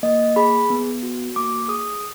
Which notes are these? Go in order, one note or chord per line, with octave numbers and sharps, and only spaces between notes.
A#3 D#5
G#4 B5
B3
F#4
A#3 D6
G#4 D#6